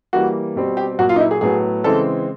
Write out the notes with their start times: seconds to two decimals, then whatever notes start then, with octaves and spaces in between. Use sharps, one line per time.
0.13 E3 G3 A#3 F#4
0.56 B2 G3 C4
0.77 G4
0.99 A#2 F#3 A#3 F#4
1.09 F4
1.16 D#4
1.20 E4
1.31 G#4
1.41 A2 F#3 B3 G#4
1.84 C#3 E3 G#3 C4 A4